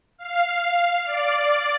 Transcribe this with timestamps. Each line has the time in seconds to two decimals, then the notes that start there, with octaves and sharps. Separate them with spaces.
0.18 F5
1.06 D5